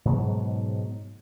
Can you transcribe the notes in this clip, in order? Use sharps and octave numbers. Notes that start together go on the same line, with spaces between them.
G#2 B2 F#3 G#3